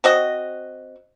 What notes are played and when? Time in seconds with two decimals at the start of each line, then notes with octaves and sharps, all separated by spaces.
0.04 C4 F#4 D#5